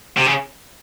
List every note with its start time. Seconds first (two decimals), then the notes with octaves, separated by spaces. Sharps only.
0.17 C3
0.26 C#3